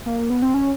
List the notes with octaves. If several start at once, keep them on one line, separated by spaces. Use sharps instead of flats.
A#3
B3
C4
C#4